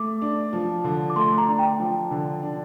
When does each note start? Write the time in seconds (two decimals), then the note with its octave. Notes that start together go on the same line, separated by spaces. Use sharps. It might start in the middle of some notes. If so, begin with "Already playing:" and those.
Already playing: A3 D6
0.22 D4
0.53 F3
0.84 D3
1.10 D6
1.16 A3 C6
1.38 A#5
1.48 D4
1.59 G5
1.80 F3
2.11 D3
2.43 D4